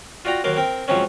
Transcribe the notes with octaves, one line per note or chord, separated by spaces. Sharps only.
F4 F#4 D5 G5 A#5
D#2 F#3 A#4 C6 D6
C4 A#4 G5
G#2 F3 F#3 C4 C#4